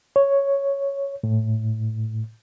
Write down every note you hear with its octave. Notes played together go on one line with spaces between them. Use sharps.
C#5
A2